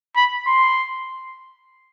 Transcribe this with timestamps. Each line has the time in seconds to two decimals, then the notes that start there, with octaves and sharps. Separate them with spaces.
0.16 B5
0.47 C6